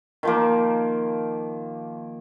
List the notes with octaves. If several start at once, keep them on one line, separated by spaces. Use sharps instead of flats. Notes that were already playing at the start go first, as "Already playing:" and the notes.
D#3 F3 A#3